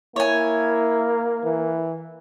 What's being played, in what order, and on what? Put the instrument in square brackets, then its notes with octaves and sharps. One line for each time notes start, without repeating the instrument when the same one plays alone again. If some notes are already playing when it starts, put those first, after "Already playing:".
[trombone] A#3 [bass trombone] E4 [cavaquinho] C#5 G#5
[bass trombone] E3